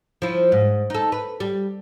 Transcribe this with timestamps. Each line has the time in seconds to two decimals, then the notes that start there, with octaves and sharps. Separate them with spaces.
0.22 F3 E4
0.52 G#2
0.90 D#4 A4
1.12 B4
1.40 G3